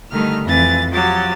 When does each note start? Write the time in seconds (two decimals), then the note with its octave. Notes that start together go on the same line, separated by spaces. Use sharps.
0.11 D3 D#3 G3 A3 D#4 F6
0.44 F2 E3 A6
0.90 F3 F#3 G4 A6